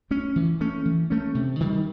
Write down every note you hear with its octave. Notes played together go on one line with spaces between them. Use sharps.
A3 C#4
E3
A3 C#4
E3
A3 C#4
C3
D#3 G3